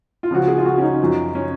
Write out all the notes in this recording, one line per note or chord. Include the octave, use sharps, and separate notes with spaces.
F4
C#2 C#3 F3 F#4
G#4
F4
F#4
C#4
D#4
F#2 F3
C#4